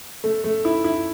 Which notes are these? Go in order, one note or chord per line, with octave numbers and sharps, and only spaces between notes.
A3
A3
E4
E4